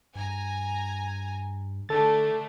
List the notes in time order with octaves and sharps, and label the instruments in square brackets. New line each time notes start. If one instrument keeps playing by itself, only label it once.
[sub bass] G2 [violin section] G#5 A#5
[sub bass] D3 [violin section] A3 D4 [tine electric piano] A4 A6